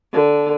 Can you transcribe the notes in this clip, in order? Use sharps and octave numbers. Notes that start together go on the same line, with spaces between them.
D3